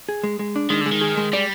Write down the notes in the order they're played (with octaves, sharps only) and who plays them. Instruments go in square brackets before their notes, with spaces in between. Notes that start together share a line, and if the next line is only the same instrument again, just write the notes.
[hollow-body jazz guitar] G#4
G#3
G#3
D4
[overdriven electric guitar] D#3 [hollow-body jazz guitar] G#3
[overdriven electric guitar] D3 [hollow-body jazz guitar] G#3
[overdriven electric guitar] D#3
[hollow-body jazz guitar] G#4
G#3
[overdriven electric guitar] G3 [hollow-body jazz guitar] D5